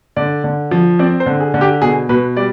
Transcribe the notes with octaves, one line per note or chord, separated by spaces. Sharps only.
D3 D5
D3
F3
C4 D5
C5
D3
G#4
D3
G4
B2 G#4
B2 B4
G3 D5